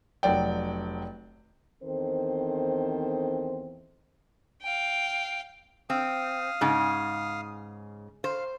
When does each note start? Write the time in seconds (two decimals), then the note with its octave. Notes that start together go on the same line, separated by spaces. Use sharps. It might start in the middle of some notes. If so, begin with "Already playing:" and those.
0.23 F1 F#3 D5 G5
1.83 E2 D#3 C4 A4 C5
4.62 F5 G5
5.90 C4 F5 D#6
6.61 G#2 C#3
8.24 C5 F5